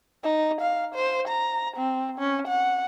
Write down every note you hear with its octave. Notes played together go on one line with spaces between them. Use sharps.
D#4
F5
C5
A#5
C4
C#4
F#5